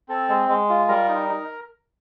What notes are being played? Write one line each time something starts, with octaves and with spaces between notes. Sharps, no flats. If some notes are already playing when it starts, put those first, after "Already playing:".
C4 A4 A5
G#3
G#3
F4
G3 A#4 A#5
D#4
D#4